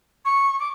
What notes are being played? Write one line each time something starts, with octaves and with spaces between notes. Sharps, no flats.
C#6
D6